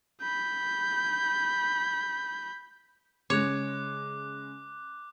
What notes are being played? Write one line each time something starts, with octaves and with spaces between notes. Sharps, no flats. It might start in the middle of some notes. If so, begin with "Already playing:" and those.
B5 G6
C#3 G#3 C#5 D6 F#6